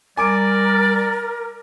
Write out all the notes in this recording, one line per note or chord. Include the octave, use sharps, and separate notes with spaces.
G3 A#4 D5 G#5 D6 D7